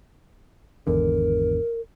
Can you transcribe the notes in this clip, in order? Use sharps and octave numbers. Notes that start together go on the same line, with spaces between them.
G#1 E2 D3 A#4